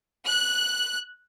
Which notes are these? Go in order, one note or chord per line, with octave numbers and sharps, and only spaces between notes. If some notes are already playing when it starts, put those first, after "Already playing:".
F#6